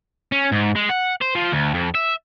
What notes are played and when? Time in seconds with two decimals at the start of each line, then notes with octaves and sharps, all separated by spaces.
0.32 C#4
0.52 G#2
0.76 G#3
0.90 F#5
1.22 C5
1.35 F3
1.52 D2
1.74 F2
1.95 E5